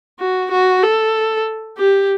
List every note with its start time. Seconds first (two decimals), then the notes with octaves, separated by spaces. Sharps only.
0.19 F#4
0.51 F#4
0.83 A4
1.78 G4